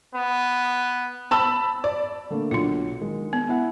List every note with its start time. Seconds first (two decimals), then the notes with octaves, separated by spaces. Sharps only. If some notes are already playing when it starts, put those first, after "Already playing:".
0.15 B3
1.31 A5 B5 E6
1.84 D5
2.30 D3 A3 A#3
2.51 B1 D4 F4
3.01 D#3 G#3
3.33 B3
3.49 E4 F#5